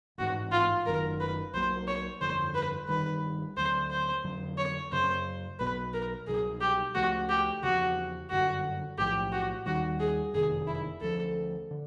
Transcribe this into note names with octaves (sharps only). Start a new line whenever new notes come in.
A1 G#2 E3 F#4
F4
F#1 F#2 D#3 A#4
B4
B1 A#2 F#3 A#3 C5
C#5
G1 F2 D3 C5
B4
G1 G2 D#3 G3 B4
D2 D3 F#3 C5
C5
F2 D3 F#3
C#5
F#2 C#3 F#3 C5
B1 B2 F#3 B3 B4
A#4
C2 B2 F#3 G#4
G4
C#2 C#3 F3 A3 F#4
G4
E2 C#3 F3 F#4
G1 F#2 D3 F#4
B1 A2 F3 G4
F#4
D#2 D#3 G3 F#4
G#4
F#1 F2 C3 D#3 G#4
E4
D2 C#3 F3 A4
D3